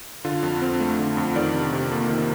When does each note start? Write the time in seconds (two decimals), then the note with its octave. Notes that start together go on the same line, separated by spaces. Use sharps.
0.25 D3 F4
0.43 F2
0.62 C4
0.80 A3
0.99 D3
1.17 F2
1.36 D#3 D5
1.54 C3
1.73 C3
1.92 A#3
2.09 D#3